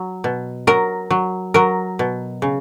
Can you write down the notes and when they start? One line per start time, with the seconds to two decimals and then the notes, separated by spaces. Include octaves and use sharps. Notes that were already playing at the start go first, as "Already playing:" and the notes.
Already playing: F#3
0.24 B2
0.67 F#3 A#4
1.10 F#3
1.54 F#3 A#4
1.99 B2
2.42 C#3